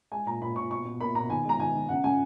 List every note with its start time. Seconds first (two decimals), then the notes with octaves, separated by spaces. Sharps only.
0.12 G#3 G#5
0.26 A#2 A#5
0.41 A#2 B5
0.56 A#2 C#6
0.71 B2 C#6
0.85 B2
1.00 A#3 B5
1.15 B2 A#5
1.30 D#3 G#5
1.45 G#3 A#5
1.60 D#3 G#5
1.75 D#3
1.89 C#3 F#5
2.04 C#3 G#5